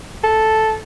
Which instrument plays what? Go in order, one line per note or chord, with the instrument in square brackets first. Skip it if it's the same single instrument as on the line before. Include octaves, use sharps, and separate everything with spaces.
[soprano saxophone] A4